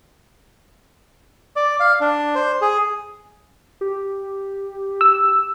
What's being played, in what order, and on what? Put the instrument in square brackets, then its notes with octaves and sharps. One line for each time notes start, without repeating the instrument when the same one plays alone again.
[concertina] D5
F5
D4
C5
G#4
[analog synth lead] G4
[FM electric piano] E6